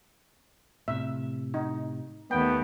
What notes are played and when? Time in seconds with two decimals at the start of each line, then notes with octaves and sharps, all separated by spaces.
0.88 A2 C3 E5
1.54 D#4
2.31 D#2 A3 B3 G5